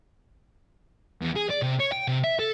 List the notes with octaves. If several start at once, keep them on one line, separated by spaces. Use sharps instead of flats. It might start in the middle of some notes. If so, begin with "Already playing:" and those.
E2
G#4
D5
C3
C#5
G5
C3
E5
A4